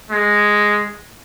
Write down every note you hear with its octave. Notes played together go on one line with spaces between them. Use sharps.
G#3